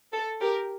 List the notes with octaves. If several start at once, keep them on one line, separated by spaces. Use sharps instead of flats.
A4
G4 A#4